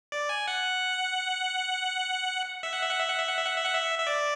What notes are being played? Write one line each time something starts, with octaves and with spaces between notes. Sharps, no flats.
D5
G#5
F#5
E5
F#5
E5
F#5
E5
F#5
E5
F#5
E5
F#5
E5
F#5
E5
E5
D5